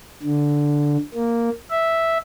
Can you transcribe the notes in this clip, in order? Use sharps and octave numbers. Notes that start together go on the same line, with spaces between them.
D3
A#3
E5